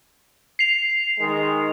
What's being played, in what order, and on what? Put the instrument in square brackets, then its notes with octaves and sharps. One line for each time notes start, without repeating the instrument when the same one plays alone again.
[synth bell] C7 F7
[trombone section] D#3 G#3